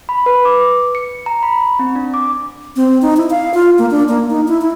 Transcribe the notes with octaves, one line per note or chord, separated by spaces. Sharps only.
B5
B4
D6
C#7
A#5
B5
C4
D4
D6
C4
D#4
E4
F5
F4
A#3
D4
A#3
D#4
E4
E4